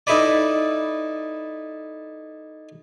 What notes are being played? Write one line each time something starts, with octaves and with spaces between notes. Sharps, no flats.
D#4 E4 A4 B4 D5